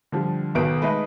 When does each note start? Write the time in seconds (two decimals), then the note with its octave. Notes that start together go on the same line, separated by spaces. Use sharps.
0.12 D3 F3 G3
0.55 B1 B2 D#3 B3 D7
0.82 G#3 A3 D#4 B4